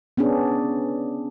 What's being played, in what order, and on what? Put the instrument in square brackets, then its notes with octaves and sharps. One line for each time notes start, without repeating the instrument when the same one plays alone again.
[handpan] B3 C#4 D4 G#4